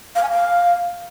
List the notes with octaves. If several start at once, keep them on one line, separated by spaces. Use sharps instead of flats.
F5
G#5
F5